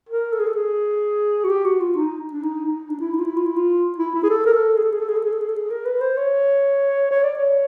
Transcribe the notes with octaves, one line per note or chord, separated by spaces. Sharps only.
A#4
A4
G#4
A4
G#4
F#4
G4
F#4
F4
D#4
D4
D#4
D#4
D4
E4
D#4
F4
E4
F4
E4
F4
E4
E4
G#4
A4
A#4
A4
G#4
A4
G#4
A4
G#4
A4
G#4
A4
G#4
A4
G#4
A#4
B4
C5
C#5
C#5
D5
C#5